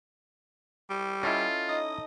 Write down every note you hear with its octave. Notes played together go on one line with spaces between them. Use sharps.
G3
C#4 E4 F4 A4 D#5
D#4 D#5